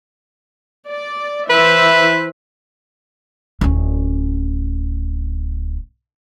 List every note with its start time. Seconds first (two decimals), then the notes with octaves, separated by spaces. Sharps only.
0.89 D5
1.50 E3 B4 C5 E5
3.61 D1 C#4